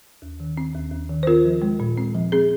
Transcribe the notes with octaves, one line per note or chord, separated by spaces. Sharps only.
D#2
D#3
C4
D#2
D#2
D#3
C5
C4 F4 A#4
F3
G#3
A#2
C4
F3
C4 G#4